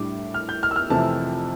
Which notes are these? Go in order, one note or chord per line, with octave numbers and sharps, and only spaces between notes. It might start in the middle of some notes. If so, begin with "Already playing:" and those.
Already playing: A2 G3 D4 D6
F6
G6
F6
E6
F6
F2 C3 E3 A3 A5